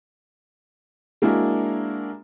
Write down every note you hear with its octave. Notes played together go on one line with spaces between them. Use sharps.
G#3 A#3 D4 E4 F#4 A#4